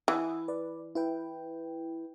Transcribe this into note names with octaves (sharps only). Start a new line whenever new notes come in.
E3 F#5 G5 D#6
B4 D5
E4 B4 G5